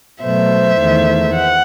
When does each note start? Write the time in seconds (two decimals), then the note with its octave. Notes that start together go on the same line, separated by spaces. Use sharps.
0.22 B2 F#3 A3 C5 E5
0.78 E2 D#3 A3
1.33 F#5